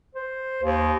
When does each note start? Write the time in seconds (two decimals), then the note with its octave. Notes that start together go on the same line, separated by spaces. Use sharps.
0.15 C5
0.62 D#2